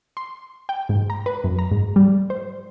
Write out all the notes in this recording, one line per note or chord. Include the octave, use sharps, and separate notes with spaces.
C6
G5
G#2
A#5
B4
F#2
A#5
G#2
G3
C5